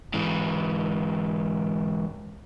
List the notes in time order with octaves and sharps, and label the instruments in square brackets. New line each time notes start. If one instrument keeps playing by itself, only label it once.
[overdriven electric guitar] G#2 E3